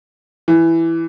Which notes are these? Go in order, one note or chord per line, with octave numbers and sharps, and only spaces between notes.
E3